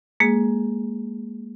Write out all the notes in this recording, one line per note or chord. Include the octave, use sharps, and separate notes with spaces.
G#3 A#3 G#4